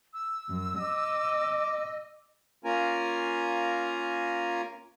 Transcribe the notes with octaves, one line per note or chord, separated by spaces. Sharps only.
E6
F#2
D#5 D6
A#3 C#4 F4 A#4 G#5 A#5